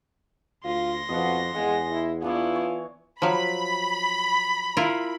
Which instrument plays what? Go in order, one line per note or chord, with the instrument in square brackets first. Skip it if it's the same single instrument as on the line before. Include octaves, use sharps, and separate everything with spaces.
[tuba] D2 [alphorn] F4 [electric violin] C6 A#6
[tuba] F2 [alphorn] B2 [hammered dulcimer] D#5 F5 F#5
[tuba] E2 [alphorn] G#3 [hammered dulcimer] F#5 G#5
[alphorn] E4
[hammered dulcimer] E3 D4 C#5 [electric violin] B3 E4 [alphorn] F4
[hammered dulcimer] C#5
[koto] F3 F#3 [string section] B5
[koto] E4 F4 A#4